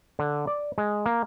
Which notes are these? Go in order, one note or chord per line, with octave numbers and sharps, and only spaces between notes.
D3
D5
G#3
A#3